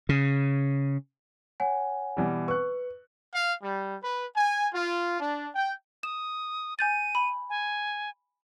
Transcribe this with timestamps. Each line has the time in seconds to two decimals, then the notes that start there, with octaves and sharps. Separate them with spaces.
0.09 C#3
1.60 C#5 F#5 G#5
2.17 B2 E3 G3
2.48 B4 C#6 F#6
3.33 F5
3.63 G3
4.03 B4
4.36 G#5
4.74 F4
5.20 D4
5.55 G5
6.03 D#6 E7
6.79 G#5 G6 A6 D#7
7.15 B5
7.50 G#5